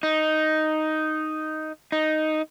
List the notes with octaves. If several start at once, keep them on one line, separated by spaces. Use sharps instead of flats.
D#4
D#4